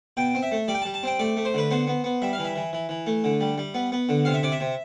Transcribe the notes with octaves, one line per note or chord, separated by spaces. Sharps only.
B2 G5
C4
E5
A3
G3 D5
G5
A5
G3
A5
C4 G5
A3 D5
A3
C5
D3 B4
B3 C5
B3
B3
G3 E5
F5
E3
E5
E3
E3
E3
A3
D3
G3
G3
B3
B3
D3
C3 F5
E5
C3 D5
E5
C3